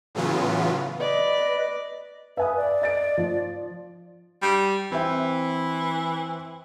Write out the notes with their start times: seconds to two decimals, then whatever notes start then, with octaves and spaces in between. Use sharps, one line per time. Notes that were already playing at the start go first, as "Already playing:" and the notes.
0.15 A2 C#3 E3 F#3 B3 F4
1.00 B4 D5 D#5
2.37 B4 E5 G#5 D#6
2.57 D5
2.82 D#5 A6 D7
3.18 F3
4.42 G3
4.91 E3 C4 E5